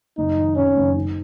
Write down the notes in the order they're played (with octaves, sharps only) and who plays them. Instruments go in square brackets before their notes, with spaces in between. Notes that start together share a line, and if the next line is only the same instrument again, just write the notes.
[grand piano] F#1 [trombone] D#4
[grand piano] D#3
[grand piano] C3 [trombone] C#4
[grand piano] F#1
D#4